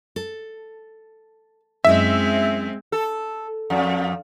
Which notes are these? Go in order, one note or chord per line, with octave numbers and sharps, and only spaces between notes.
A4
F#2 G#3 C4 E4 D#5 E5
A4
F2